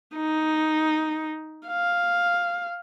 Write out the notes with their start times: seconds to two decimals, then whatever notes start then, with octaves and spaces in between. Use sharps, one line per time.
0.16 D#4
1.67 F5